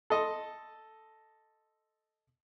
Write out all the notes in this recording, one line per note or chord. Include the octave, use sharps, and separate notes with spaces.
A4 D#5 C6